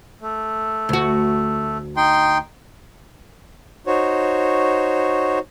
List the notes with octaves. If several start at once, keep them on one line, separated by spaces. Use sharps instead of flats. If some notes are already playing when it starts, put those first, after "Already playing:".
A3
D2 F#4
D#4 G5 C6
D#4 F#4 C5 C#5